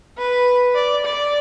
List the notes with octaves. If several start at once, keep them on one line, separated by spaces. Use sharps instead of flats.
B4
D5
D5